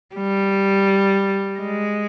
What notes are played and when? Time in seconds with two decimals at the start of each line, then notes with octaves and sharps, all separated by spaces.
0.16 G3
1.60 G#3